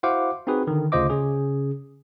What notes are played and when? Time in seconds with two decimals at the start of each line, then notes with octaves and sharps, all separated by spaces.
0.03 E4 F#4 C5 F5 F#5 D6
0.47 C4 D#4 F#4 G#4 B4
0.67 D3 D#3
0.92 D2 C#3 F4 C5 D#5 D6
1.10 C#3 C#4 G#4